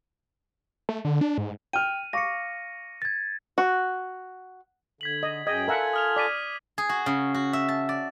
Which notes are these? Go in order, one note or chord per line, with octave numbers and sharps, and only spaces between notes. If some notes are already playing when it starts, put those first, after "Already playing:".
A3
D3
D4
G#2
G5 F6 D#7
F5 C#6 D6 A#6 C#7
G#6 A6
F#4
D3 G#6 B6 F#7
D#5
F#2 G#4 D#5 G5 G#6
F4 A4 A#4 E5 F#5 G#5
D#6 F6 F7
D5 D6 B6 D#7
G#4
F#4
C#3
F#4
E5
A5
D5